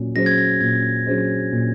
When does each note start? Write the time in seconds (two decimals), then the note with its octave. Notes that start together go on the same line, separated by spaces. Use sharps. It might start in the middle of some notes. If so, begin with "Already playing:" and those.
Already playing: A#2 F#3 C#4
0.15 F#3 C#4 G#4 C5 A#6
0.26 G#6
0.38 A#6
0.61 A#2 G#6
1.06 F#3 C#4 G#4 C5
1.52 A#2